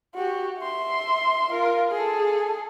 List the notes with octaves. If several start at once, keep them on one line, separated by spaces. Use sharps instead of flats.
F#4 G4
E5 C6
F4 A#4
G#4 A4